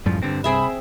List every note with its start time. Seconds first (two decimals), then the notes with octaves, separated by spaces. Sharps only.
0.05 C#2 F#2 A2 C#3 F3 G3
0.23 G2 D3 C4
0.44 C2 C4 G#4 E5 B5